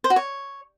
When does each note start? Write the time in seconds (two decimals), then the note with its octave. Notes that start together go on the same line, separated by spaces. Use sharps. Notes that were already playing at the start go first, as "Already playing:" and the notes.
0.04 C5
0.10 F#4
0.16 C#5